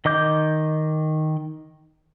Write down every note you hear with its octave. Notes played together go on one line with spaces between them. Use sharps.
D#3 D#5 D6 G6